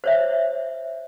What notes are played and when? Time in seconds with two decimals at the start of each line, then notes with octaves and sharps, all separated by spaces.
0.04 C5 C#5 E5